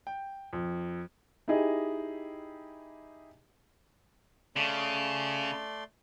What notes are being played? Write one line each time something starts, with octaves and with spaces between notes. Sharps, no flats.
G5
F2
D#4 E4 G4 G#4 D#5
C#3 A3 D5 C6